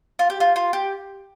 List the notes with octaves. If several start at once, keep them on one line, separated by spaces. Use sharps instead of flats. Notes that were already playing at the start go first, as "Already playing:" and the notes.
F4
G4
F4
F4
G4